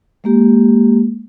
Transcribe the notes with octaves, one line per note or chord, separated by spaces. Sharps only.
G#3 A#3 G4